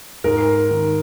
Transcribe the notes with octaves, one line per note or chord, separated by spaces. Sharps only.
G#2 A#4
D#3